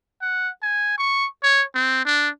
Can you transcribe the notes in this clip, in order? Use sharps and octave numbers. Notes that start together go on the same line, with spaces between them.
F#5
G#5
C#6
C#5
C4
D4